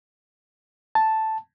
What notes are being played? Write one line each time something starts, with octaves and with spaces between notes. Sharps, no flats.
A5